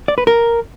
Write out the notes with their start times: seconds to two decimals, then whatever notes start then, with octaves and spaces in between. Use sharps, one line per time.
0.08 D5
0.18 B4
0.27 A#4